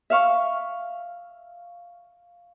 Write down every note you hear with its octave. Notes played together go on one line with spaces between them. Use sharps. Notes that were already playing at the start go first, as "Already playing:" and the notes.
E5 F5 C#6 F6